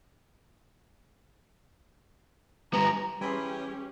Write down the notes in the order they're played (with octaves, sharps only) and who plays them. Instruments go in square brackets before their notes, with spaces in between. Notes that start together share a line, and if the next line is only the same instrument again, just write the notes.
[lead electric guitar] G2 B3 [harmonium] A#5
[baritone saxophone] E3 [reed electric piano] G3 G#4 [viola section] C#4 G4 [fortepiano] G5 B5 C6